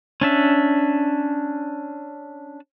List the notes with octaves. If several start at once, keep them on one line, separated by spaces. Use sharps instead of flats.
C#4 D4 E5